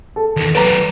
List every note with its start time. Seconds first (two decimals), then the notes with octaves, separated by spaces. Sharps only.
0.16 A4
0.37 E2 D#3
0.55 F#3 B4 D5 A#5